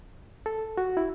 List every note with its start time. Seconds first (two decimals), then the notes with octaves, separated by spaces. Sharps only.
0.46 A4
0.77 F#4
0.97 E4